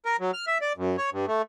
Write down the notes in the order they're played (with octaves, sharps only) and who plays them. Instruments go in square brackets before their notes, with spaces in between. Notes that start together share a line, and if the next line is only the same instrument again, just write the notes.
[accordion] A#4
F#3
F6
E5
D5
F#2
C#5
G2
A3